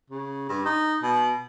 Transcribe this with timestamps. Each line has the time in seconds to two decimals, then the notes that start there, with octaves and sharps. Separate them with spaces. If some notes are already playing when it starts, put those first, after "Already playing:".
0.10 C#3
0.49 G2
0.65 D#4
1.03 B2